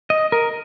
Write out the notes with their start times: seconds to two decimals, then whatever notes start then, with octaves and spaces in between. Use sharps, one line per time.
0.10 D#5
0.32 A#4